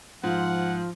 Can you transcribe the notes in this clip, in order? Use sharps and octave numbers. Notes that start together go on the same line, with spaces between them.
G#2 F3 F4 F#5